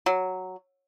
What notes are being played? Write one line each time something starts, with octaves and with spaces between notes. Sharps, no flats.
F#3